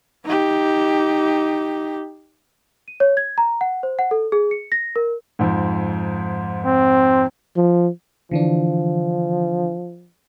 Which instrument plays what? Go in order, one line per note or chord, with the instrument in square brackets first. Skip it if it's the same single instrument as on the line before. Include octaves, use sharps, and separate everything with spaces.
[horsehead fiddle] D#4 G4
[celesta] D#7
C#5
G#6
A#5
F#5
C5
F#5
A4
G#4
C#7
A#6
A#4
[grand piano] F2 G#2
[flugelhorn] C4
[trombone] F3
[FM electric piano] D3 E3 D4 [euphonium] F3